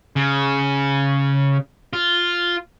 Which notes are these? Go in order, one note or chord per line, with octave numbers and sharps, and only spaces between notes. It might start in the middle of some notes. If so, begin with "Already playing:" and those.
C#3
F4